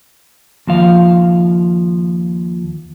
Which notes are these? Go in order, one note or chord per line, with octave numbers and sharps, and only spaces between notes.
D#2 F3 F5